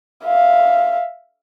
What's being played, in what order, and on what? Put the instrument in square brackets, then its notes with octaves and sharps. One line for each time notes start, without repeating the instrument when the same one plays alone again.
[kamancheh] E5 F5